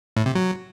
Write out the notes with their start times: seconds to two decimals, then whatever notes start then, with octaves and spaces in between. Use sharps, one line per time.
0.17 A2
0.26 C3
0.35 F#3